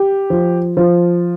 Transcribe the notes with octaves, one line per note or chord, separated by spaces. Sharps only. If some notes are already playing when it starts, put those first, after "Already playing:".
Already playing: G4
F3
F3